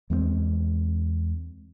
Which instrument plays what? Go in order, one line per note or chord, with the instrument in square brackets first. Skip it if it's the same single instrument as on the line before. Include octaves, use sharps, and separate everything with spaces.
[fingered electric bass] E2 G#3 B3 C4